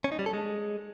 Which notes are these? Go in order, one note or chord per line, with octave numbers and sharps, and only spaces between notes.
C#4
D#4
G3
A4
G#3